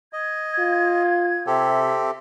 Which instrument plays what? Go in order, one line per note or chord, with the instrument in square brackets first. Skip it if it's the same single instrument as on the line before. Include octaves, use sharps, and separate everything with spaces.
[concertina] D#5 [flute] G#6
[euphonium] F4
[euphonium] C3 [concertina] C4 G4 A4 [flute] E5